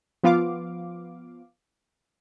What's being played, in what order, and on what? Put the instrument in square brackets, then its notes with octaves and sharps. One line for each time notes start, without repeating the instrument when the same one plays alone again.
[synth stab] F3 B3 F4 F5 D6